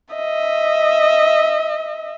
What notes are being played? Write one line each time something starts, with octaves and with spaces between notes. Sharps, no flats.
D#5 E5